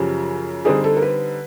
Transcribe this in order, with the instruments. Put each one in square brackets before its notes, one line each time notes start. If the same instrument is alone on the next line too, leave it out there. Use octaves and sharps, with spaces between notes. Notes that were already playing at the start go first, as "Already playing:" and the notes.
Already playing: [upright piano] F#2 C#3 F3 [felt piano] G4
[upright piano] D3 G3 C4 D#4 G4 [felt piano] G#4
[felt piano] A4
A#4
B4